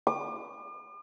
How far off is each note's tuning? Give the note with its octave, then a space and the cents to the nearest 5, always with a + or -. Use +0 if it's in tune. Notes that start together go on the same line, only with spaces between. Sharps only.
D6 +45